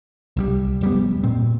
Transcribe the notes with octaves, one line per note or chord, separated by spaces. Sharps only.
C2 F3 G3
F1 G3 B3
A#2 C4